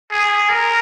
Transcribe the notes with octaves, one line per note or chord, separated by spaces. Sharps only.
G#4
A#4